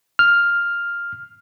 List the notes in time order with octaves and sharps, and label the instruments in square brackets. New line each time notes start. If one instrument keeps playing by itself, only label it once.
[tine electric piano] F6